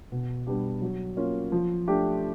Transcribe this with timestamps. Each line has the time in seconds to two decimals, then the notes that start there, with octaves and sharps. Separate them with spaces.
0.12 B2
0.47 G3 B3 D4 G4
0.82 F#3
1.17 A#3 C#4 F4
1.52 F3
1.88 A3 D4 G4